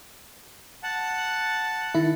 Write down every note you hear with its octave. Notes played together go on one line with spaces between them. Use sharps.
F#5 A5
D#3 E4